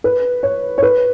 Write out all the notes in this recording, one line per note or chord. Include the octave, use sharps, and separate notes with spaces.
B4
C#5
C#5
B4